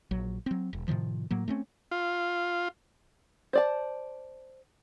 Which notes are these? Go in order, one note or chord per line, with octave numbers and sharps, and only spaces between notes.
A#1 F#3
F#3 C4
E1
A2 C3 D#3 F3
A2 F#3 A#3
A3 C4 C#4
F4
C5 D5 A5